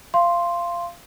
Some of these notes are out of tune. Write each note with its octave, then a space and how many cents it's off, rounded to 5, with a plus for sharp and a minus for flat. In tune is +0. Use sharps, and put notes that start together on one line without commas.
F5 -20 C6 +0